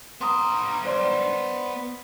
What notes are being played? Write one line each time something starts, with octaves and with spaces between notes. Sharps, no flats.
B3 A#5 C6 D#6
C5 D5 C6